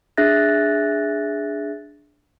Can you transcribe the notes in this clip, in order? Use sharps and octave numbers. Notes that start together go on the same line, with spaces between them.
D4 G#4 E5 F#6 A6 A#6